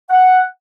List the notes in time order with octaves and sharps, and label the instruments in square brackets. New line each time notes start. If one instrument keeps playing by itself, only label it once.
[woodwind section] F#5